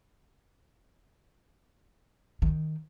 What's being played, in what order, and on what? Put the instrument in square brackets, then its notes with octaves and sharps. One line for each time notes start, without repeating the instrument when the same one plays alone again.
[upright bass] D#3